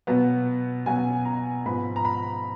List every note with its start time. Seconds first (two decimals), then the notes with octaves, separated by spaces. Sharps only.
0.07 B2 F#3 B3
0.86 B2 F#3 B3 G#5
1.25 A#5
1.66 G#2 F3 B3 B5
1.96 A#5
2.05 B5